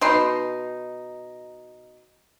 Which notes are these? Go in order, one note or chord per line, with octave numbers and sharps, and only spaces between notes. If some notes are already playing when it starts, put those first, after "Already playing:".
B2 D#4 C6